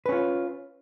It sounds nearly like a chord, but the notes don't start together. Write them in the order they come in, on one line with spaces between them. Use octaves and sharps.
B4 C#4 F4